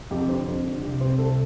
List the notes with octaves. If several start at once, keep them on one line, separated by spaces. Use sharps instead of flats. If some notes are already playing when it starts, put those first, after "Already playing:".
F2 G4
D3 C5
F2
D3
C2 G4
C3 C5
C2 A4